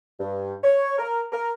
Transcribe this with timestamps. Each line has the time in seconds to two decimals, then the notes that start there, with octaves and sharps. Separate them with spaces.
0.19 G2
0.64 C#5
0.98 A#4
1.32 A#4